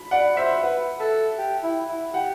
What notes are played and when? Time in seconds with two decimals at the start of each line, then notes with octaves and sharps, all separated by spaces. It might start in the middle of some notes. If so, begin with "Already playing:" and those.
Already playing: B5
0.11 D5 F#5
0.37 C5 E5
0.62 B4 F#5
1.00 A4 E5
1.38 G4
1.64 E4
1.89 E4
2.14 G4 F#5